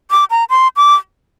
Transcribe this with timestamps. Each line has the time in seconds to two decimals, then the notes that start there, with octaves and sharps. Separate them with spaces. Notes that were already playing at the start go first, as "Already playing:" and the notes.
0.11 D6
0.31 A#5
0.50 C6
0.76 D6